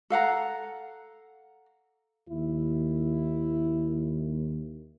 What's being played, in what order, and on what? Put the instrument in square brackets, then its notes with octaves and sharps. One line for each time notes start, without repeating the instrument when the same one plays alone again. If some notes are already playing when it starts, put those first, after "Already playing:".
[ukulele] A4 F5 F#5 A#5
[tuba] D#2 [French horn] E4